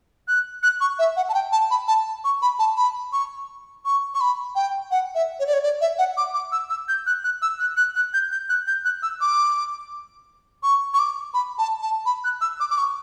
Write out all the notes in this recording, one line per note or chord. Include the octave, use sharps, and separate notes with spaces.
F#6
F#6
C#6
E5
F#5
A5
G5
A5
B5
A5
C#6
B5
A5
B5
C#6
C#6
C#6
B5
G5
F#5
E5
C#5
D5
C#5
D5
E5
F#5
D6
D6
E6
E6
G6
F#6
F#6
E6
F#6
F#6
F#6
G6
G6
F#6
G6
F#6
E6
D6
C#6
C#6
D6
B5
A5
A5
B5
F#6
E6
D6
D6
C#6